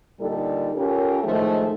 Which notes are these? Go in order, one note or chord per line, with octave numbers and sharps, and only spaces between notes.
A#2 D3 G3 D#4 A4
C#4 F4 G4 A4 A#4
A2 D#3 F3 G#3 A3